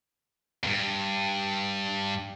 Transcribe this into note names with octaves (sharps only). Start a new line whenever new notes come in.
E2 G2